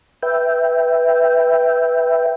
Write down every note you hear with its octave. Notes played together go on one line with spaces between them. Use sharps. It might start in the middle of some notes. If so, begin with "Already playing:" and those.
B4 E5 G5